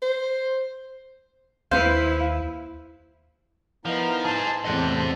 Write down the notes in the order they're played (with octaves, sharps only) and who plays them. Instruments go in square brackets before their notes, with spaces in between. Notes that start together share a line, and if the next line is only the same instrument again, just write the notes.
[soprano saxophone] C5
[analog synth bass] D#2 [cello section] E4 [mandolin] B4 F5 [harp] C5
[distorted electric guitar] F3 [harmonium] B3 D#4 E4 [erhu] A#4
[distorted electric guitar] G#4 C5 [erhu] A5
[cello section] E2 A2 C3 [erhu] A4 [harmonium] C5 [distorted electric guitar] D#5 F#5